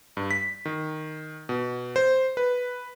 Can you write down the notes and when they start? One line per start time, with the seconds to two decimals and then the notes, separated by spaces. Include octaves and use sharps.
0.17 G2
0.31 B6
0.65 D#3
1.49 B2
1.96 C5
2.37 B4